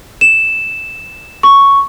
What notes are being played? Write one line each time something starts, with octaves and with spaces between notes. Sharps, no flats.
E7
C#6